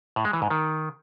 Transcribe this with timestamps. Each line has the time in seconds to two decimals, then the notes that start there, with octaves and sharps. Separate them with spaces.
0.16 A2
0.25 G#3
0.33 E3
0.42 G#2
0.50 D#3